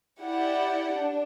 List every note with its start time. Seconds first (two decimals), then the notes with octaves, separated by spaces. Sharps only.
0.22 E4 G4 D5 F#5
0.95 D4